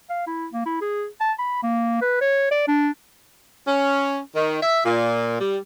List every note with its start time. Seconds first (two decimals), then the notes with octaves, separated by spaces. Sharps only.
0.10 F5
0.27 E4
0.53 A#3
0.66 E4
0.81 G#4
1.21 A5
1.39 B5
1.63 A#3
2.02 B4
2.21 C#5
2.51 D5
2.68 D4
3.66 C#4
4.35 D#3
4.62 E5
4.85 A#2
5.40 G3